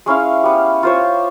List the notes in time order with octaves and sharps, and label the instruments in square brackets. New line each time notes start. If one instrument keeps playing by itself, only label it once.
[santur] G#3 C#4 E4 F5
B3 G4
F4 C5 C#5